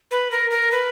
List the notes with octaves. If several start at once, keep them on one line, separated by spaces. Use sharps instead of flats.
B4
A#4
A#4
B4